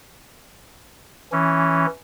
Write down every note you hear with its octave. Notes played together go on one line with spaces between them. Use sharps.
E3 C#4